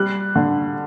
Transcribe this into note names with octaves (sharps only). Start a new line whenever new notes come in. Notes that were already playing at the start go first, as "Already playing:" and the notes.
Already playing: G3 F#6
D3